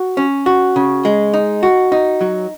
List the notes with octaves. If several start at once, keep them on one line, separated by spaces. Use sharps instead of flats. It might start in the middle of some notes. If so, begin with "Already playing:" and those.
Already playing: F#4
C#4
F#4
C#3
G#3
D#4
F#4
D#4
F#3